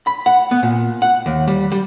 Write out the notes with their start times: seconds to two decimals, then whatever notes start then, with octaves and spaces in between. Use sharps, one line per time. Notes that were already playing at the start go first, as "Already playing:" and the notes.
0.07 B5
0.26 F#5
0.51 B3
0.63 A#2
1.02 F#5
1.26 D#2
1.47 G3
1.72 G3